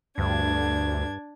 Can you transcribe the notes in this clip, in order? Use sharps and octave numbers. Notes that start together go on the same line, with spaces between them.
D2 G2 D4 G#6